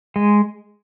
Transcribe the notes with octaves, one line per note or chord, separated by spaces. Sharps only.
G#3